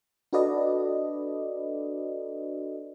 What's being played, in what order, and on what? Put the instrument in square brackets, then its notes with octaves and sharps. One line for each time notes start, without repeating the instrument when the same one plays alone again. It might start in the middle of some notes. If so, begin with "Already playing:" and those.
[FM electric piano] D4 F#4 A4 B4 D5 D#5